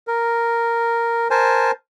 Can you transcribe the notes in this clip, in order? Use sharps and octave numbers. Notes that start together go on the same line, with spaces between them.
A#4
A#4 C5 G#5 A5